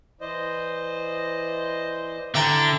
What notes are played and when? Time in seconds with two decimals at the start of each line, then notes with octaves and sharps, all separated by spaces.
0.21 E3 E4 C5 D5 D#5
2.35 D3 E4 A4 E5 G5 A#5